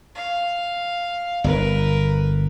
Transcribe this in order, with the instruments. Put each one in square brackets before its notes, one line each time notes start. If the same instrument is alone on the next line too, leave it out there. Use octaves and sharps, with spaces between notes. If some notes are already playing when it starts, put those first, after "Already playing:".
[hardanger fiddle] F5
[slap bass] G1 [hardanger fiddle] A#4 B4